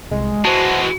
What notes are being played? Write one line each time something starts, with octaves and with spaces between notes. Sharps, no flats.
C2 G#3
E3 G#3 F#4 C5 A5